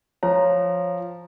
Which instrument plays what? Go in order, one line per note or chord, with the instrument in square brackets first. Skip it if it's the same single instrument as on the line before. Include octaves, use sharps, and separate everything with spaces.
[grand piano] F3 A#5 [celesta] C#5